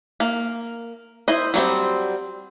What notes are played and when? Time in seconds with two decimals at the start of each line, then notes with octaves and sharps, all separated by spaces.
0.20 A#3
1.28 E4 C5 D#5
1.54 F#3 G3 C4